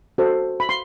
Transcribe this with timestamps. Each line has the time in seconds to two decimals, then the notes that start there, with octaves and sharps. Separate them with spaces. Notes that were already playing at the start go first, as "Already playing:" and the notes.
0.18 F#4 A4 C5
0.60 B5
0.69 C6